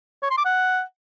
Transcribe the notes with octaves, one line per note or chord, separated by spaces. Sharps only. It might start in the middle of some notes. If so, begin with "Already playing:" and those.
C#5
C6
D6
F#5